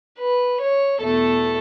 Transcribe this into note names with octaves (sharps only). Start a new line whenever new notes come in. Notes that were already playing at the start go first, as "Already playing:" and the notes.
B4
C#5
E2 B2 A3 A4